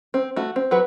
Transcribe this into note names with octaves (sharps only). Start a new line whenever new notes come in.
C4
A3 F#4
C4
F#3 F#4 B4